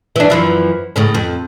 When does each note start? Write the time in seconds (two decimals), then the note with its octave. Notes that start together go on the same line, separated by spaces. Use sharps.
0.16 E3 D4
0.30 F#2 E3 F3
0.96 A2 C#3 C#4
1.14 F2